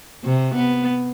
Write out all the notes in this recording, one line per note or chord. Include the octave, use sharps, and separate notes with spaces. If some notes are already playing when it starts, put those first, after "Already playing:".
C3
B3